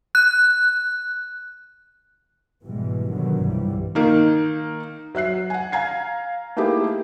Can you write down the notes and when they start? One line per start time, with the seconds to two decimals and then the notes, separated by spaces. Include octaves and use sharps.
0.15 F#6
2.65 G#2 B2 E3 G3 G#3
3.11 G#1 B2 D3 D#3 F#3
3.41 C2 G2 A#2 E3 G3
3.95 D#3 A#3 D#4
5.15 F#3 E5 F#6 C7
5.50 F#5 G#5
5.72 F5 G#5 A#5 G#6 C7
6.56 A3 A#3 D#4 E4 G4 G#4